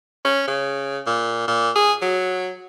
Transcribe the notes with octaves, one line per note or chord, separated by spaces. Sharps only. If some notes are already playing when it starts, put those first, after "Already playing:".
C#4
C#3
A#2
A#2
G#4
F#3